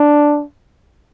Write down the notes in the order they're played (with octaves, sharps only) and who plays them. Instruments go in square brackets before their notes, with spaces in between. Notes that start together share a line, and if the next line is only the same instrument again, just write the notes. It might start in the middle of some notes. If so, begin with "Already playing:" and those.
Already playing: [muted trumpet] D4